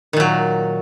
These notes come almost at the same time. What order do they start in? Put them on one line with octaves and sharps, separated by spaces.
D#3 A#2 F#3